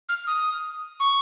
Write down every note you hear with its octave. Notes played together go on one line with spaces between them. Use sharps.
F6
D#6
C#6